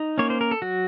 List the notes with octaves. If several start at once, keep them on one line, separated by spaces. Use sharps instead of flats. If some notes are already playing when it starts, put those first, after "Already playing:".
Already playing: D#4
A#3 C#4 C#5
C5
A#4
A4
F#3 F#4